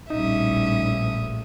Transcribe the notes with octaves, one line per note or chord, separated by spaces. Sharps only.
A#1 A2 G3 C#4 D#4 E5 D#6